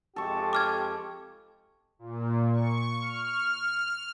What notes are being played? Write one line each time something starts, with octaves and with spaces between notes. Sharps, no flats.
F2 G#3 G4 A4 C#6
D6 F6 G#6
A#2
C#6
F6